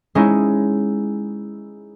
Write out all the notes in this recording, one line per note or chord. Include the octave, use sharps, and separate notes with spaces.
G#3 C#4 D#4 E4